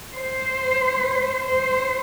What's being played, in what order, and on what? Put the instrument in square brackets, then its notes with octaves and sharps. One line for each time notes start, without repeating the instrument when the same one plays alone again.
[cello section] C5
C5